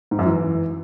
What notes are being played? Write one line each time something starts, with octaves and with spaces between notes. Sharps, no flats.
G#2
F#2
E3